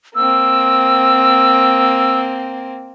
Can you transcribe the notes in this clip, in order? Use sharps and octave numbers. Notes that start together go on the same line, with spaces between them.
A#3 C4 E6